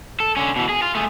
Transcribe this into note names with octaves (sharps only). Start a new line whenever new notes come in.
A4
D3 C#4
B2 E3
G#4
F4
A3 G#4